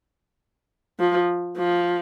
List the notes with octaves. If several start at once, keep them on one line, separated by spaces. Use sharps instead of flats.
F3
F3